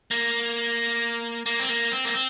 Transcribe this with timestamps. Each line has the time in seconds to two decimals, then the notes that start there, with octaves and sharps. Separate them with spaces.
0.11 A#3
1.46 A#3
1.60 C4
1.69 A#3
1.92 C4
2.04 A#3
2.14 C4